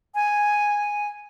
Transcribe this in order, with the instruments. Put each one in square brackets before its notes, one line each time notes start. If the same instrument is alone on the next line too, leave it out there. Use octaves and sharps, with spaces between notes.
[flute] G#5